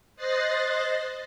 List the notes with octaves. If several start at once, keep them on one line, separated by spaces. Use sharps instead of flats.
C5 D#5 F#6 A6 A#6 C7